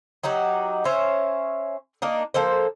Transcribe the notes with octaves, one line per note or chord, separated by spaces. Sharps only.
F#3 D#4 F#4 G4
C#4 C5 C#5 E5
A#3 D4 D#4
F3 A#3 A4 C5